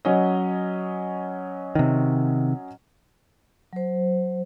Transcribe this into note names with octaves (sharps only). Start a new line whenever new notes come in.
F#3 C#4 D#5
C3 D#3
F#3 C5